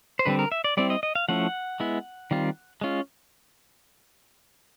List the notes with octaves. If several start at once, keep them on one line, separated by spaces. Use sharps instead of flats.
C5
D3 G3 C4 B4
A#4
E5
D5
G3 C4 E4 D5
D#5
D#5
F5
F3 A3 C#4 E4 F#5
G#3 B3 E4
D#3 G3 C4 F4
G#3 C#4 F4